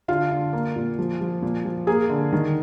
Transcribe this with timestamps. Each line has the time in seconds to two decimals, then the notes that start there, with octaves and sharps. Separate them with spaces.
0.08 D3 F4 F5
0.31 D3
0.53 A#3
0.76 A#2
0.99 F3
1.21 F3
1.42 A#2
1.65 F3
1.87 A#3 G#4 G#5
2.10 D3
2.32 D#3